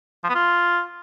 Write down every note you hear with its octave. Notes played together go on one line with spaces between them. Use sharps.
F3
B3
F4